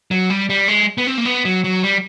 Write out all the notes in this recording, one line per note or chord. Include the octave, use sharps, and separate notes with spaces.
F#3
G3
G3
G#3
B3
C4
A#3
B3
F#3
F#3
G3